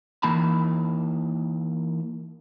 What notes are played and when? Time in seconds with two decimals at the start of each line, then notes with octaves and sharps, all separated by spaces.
0.23 E3 A#3 D#4 A5 B5